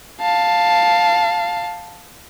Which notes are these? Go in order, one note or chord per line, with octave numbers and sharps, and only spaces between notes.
F5 A5